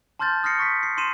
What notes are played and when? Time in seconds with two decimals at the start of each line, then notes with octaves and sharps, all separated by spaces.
0.19 A5 C6 F6 G6 A6
0.43 D#6 F6 A6 A#6 C7 C#7
0.59 C#6 A#6 B6
0.83 C7
0.98 C6 C7 D#7 E7